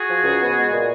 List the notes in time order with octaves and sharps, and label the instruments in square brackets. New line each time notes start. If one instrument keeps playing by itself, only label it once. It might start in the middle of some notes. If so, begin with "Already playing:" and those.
Already playing: [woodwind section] F#4 G#4
F3
C#2
B3
G#3
A#2